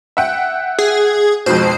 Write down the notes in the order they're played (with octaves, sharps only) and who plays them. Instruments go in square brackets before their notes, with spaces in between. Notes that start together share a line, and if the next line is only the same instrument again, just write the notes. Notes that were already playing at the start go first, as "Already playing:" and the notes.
[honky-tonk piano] E5 F#5 G5
[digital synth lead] G#4
[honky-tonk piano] F2 G#2 B2 [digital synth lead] C5